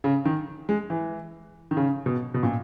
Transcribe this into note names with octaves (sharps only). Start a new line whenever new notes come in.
C#3
D#3
G#3
E3
D#3
C#3
B2
B2
A#2